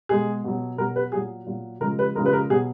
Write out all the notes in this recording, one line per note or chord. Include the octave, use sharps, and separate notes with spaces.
B2 G#3 G#4
B2 F#3
B2 F#3 A#4
B4
A#2 F#3 G#4
A#2 F#3
C#3 F3 G#3 A#4
B4
C#3 F3 G#3 A#4
B4
A#4
B2 F#3 G#4